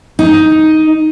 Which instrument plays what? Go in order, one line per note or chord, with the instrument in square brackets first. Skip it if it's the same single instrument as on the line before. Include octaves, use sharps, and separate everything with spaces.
[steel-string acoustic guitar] D#4